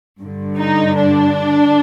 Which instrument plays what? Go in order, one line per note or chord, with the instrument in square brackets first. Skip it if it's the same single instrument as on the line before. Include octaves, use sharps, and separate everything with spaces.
[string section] G2 D3
D#4
D4